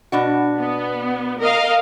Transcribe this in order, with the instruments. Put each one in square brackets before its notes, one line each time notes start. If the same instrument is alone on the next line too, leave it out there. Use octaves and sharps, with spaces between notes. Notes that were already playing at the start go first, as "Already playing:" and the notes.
[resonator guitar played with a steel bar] B2 D4 F#4
[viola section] B3
A#4 D#5 F5